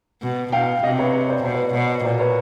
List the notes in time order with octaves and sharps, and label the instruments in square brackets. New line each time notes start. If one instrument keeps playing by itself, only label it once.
[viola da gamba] B2
[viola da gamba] B2 [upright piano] F5 G5
[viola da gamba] C3 [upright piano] D#5 F5
[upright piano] B4 C#5
B4 C#5
C5 D5
[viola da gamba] B2 [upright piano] C5 D5
[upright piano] B4 C#5
C5 D5
[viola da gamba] B2 [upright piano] C#5 D#5
[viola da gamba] A#2 [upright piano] C5 D5
[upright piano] B4 C#5